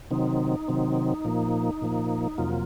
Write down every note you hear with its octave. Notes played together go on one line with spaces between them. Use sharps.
C3 D#3 F#3 C4 D#4
C3 D#3 F#3 C4
A#2 F3 A#3
A#2 F3 A#3
F2 C3 F#3 A#3 F4